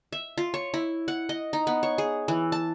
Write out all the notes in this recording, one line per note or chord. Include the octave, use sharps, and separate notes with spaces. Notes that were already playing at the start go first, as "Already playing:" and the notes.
E5
F4
C#5
E4
F#5
D#5
D#4
B3
C#5
G#4
E3
A5